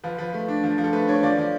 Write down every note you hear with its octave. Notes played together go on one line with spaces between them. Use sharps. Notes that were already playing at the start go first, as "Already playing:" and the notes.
F3 B4
F3 B4
A3
D4
F3
F3
A4
A3 B4
D4 C#5
F3 D5
F3